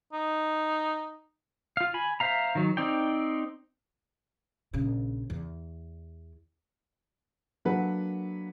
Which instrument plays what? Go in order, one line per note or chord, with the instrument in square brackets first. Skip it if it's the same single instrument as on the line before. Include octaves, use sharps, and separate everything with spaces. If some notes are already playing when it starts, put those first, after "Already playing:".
[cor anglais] D#4
[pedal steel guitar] F4 F5
G#5 B5
C5 E5 F5 A#5
D#3 F#3
C4 D#4 D5 G5
[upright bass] A#1 C#3
E2
[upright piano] F#3 A#3 D4 A4 B4 F#5